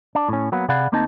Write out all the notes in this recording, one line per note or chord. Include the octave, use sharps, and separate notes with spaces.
D4
A2 C#4
F#3 A#3 B3
C3 G#4 D5 F5 F#5 B5
D2 A#3 C4 D#4 D#5 A5